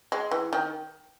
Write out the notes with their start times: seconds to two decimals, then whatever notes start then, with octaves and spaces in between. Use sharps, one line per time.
0.12 G#3
0.31 E3
0.53 D#3